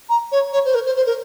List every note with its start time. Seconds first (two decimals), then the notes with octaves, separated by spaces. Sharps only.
0.09 A#5
0.32 C#5
0.53 C#5
0.65 C5
0.75 A#4
0.86 C5
0.96 C5
1.07 A#4